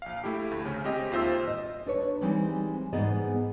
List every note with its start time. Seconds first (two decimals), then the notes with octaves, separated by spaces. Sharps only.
0.02 A#1 F5
0.24 A3 E4 G4
0.51 D2
0.65 C#3 C#4
0.84 G#3 C4 G4 D#5
1.12 D#2 F4 C5 E5 E6
1.48 D#5
1.86 D4 B4 C#5
2.21 E3 G3 G#3 C4 D#4
2.93 G#2 E3 B3 G#4 D5 D#5